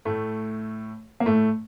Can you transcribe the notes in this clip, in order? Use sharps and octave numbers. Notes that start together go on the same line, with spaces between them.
A2 A3
A#3
A2 A3